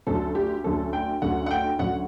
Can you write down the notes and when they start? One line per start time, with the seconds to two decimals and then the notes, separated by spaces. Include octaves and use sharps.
0.07 D2 D3 F#3 C#4 A4
0.35 G4
0.64 D2 D3 F#3 C#4 A4
0.93 G5
1.22 D2 D3 F#3 C#4 F#5
1.46 F#5
1.51 G5
1.79 D2 D3 F#3 C#4 F#5